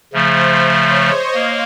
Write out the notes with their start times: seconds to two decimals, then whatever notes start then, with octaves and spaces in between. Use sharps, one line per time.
0.12 C#3 F3 A3 C5
0.74 C#5
1.04 D#5
1.35 A#3 F5